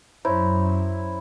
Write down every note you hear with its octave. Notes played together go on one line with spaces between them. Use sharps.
F#2 E4 C5 C#5 A#5